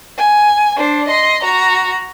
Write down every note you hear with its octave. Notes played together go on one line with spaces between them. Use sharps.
G#5
D4 C5
D#5 C6
F#4 A#5